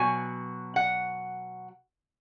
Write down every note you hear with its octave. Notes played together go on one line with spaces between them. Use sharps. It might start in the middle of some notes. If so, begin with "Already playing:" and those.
Already playing: B2 F#3 G#5
F#5